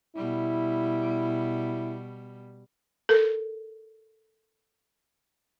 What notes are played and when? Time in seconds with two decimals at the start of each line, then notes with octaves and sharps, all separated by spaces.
0.16 B2 G3 E4
3.09 A4 A#4